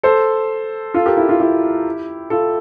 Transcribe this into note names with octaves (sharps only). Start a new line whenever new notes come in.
A4 C5
F4 A4
G4 A#4
E4
F4
E4 G4
F4 A4